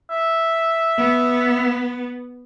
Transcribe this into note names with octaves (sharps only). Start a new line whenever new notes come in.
E5
B3